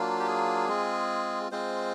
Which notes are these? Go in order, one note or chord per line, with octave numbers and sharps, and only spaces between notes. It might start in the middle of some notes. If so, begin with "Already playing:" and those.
Already playing: F#3 A#3 D4 F4
G4
G#4
G#3 C4 F4
G#3 C4 F4 C5